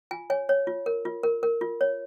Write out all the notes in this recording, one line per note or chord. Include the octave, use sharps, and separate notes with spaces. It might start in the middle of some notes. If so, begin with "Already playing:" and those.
F4 G#5
C#5 G#5
C#5
F4
A#4
F4
A#4
A#4
F4
C#5